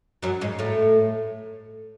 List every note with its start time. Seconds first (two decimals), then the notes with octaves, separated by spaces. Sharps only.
0.22 F#2 F#3
0.41 G#2 G#3
0.59 A2 A3